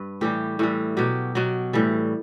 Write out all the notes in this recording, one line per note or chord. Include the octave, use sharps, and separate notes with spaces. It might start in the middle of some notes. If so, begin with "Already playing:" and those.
Already playing: G2 B4
A2 E3 G3 G4
A2 E3 G3
B2 F#3 G4
B2 F#3
A2 E3 G3